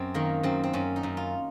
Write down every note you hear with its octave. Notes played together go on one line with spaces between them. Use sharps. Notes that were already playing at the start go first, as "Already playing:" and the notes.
Already playing: F#2 C4
D#3 A#3
F#2 C4
C4
F#2 C#4
D#4
F#2
F4